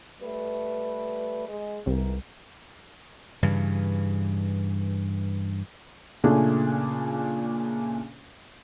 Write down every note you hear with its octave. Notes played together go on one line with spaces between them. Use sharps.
G3 A3 B4
G#3
C2 G#2 E3 A#4
G2 C#3 E3
A#2 C#3 A3 C#4 D4 G#4